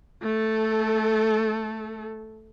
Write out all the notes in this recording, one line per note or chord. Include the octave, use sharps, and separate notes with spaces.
A3 A4